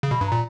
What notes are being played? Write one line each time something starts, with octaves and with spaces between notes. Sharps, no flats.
C#3
B2 B5
G2
A#5
A#2